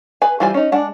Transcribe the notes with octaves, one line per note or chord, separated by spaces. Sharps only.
G#4 B4 G#5
E3 G3 F4 C5 G#5
C#4 D#4
G#3 D4 F#5